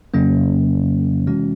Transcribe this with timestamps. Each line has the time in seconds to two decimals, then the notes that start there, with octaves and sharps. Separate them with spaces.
0.14 F2 C#3 F#3 A#3 C#4
1.27 C3 E3 G#3 C#4 F#4